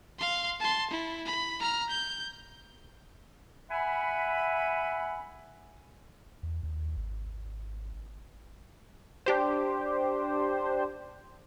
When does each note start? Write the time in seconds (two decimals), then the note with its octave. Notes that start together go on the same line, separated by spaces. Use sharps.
0.19 F5 C6
0.60 A5 C6
0.91 E4
1.25 B5
1.60 A#5 F6
1.90 G6
3.70 E5 F#5 G#5 B5
6.43 E2
6.63 D#2
6.97 G#1
9.26 D4 G4 C5